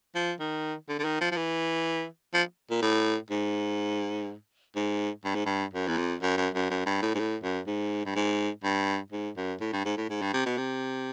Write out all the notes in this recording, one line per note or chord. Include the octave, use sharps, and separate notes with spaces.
F3
D#3
D3
D3
D#3
F3
F3
E3
F3
A#2
A2
G#2
G#2
G2
G#2
G2
F#2
E2
F2
F#2
F#2
F#2
F#2
G2
A2
G#2
A2
F#2
G#2
G2
G#2
G2
G#2
F#2
A2
G2
G#2
A2
G#2
G2
C3
B2
C3